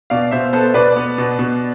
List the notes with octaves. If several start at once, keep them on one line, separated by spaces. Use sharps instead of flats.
B2 D5 F5
B2 C5 E5
B3 A4 C5
B2 B4 D5
B3
B2
B2